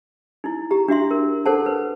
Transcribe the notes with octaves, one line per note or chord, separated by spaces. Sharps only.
D#4 E4
G4 A#5
D4 F#4 E5 C6
A#4
A4 A#4 C5 F#5 A5
B4